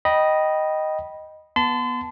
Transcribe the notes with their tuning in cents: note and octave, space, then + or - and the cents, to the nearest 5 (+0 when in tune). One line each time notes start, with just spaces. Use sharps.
D#5 +0 G5 -15 B5 -20
B3 -20 A5 -5 C6 -40